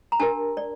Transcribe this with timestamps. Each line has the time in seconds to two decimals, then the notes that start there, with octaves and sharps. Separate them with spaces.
0.12 A#5
0.20 D4 G4 A#4 A5
0.57 D5